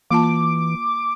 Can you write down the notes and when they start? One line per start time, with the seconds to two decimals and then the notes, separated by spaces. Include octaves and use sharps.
0.11 E3 A#3 F4 A5 D6